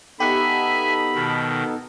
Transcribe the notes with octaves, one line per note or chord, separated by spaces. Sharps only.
B3 D#4 G4 A4 E5 F#5 G#5 B5
B2 D#3